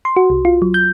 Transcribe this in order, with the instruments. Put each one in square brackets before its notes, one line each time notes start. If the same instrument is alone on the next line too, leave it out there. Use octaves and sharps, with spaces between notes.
[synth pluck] C6
F#4
C2
F4
F#3
G6